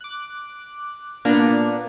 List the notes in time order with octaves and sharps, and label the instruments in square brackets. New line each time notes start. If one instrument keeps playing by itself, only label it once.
[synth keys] D6 F#6
[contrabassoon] A#2 [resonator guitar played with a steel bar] A#3 [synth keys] B3 D4